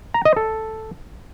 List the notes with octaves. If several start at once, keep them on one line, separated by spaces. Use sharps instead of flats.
A#5
D#5
A4